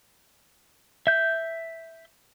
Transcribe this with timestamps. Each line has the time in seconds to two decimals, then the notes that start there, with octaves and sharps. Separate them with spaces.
1.07 E5 G6